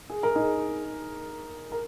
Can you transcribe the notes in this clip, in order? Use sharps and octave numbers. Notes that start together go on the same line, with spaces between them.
G#4
A#4
D#4 G#4
A#4